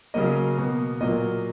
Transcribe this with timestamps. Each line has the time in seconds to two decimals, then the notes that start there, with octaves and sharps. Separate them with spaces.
0.14 C#3 F#3 A#3 D#5
0.57 B2 A#3
1.01 A#2 F#3 A#3 D#5